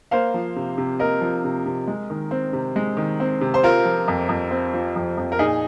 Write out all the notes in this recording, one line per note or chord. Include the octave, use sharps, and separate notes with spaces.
A#3 C5 F5
F3
C3
C3
A#3 A#4 D#5
F3
C3
C3
G#3
D#3
C4
C3
G#3
D#3
C4
C3
C5
C4 F4 A#4
F3
F2
F2
C4
F3
F2
F2
A#4
A#2 D#4 G#4